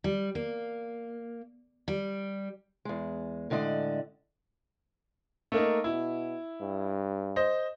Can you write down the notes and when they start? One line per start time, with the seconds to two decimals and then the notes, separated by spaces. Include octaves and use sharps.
0.04 G3
0.35 A#3
1.88 G3
2.85 E2 G#3
3.50 A2 D3 G#3 D5 D#5
5.52 A3 A#3 D#4
5.84 B2 E4
6.60 G2
7.36 C5 D#5